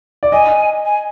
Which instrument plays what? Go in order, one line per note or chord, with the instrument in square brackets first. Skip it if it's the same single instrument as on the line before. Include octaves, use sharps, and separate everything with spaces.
[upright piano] D5
[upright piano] D#5 [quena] G#5
[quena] G#5